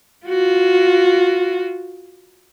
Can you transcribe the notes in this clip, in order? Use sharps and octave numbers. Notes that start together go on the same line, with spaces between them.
F4 F#4